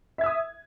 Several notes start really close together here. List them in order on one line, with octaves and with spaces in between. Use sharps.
E5 G#6 E6 D#6